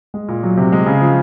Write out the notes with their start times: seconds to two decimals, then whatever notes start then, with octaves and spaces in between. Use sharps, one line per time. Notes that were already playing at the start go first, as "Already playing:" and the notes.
0.14 G#3
0.28 A#2
0.43 F#3
0.57 C3
0.72 G#3
0.86 C#3
1.01 F3